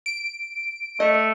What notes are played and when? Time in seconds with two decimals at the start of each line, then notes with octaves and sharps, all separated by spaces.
0.06 D7
1.00 A3 D#5